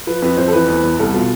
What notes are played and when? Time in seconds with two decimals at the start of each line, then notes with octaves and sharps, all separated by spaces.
0.07 F3 B4
0.22 F2 B4
0.37 F2 C5
0.48 A4
0.53 E3 B4
0.68 E2
0.83 E2
0.99 C2 A4
1.14 B2 F4